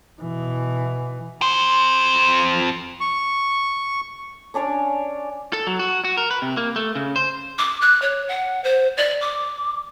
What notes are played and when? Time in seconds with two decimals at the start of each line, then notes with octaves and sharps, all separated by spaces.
0.21 B2 E3
1.42 F2 C5
3.00 C#6
4.54 C#4 D4 C#5 D5
5.53 A4
5.67 F#3
5.79 F#4
6.05 F#4
6.17 A#4
6.31 B4
6.42 C3
6.57 A#3
6.76 A3
6.95 C#3
7.16 C5
7.59 D6
7.82 F#6
8.02 C#5
8.28 F#5
8.64 C5
8.97 D5
9.21 D6